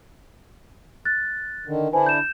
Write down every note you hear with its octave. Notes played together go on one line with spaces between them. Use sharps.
F#6 A6
D3 D#3
D3 D4 E4 B4 C5 G#5
G6 E7